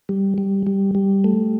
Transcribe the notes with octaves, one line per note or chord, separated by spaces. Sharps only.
G3
G3
G3
G3
A3